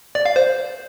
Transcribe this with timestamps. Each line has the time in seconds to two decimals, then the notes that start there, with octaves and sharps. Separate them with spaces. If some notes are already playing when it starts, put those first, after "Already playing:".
0.15 D5
0.26 F5
0.36 C5